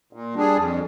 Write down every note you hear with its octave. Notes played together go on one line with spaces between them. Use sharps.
A#2
G3 D4 G#4
F2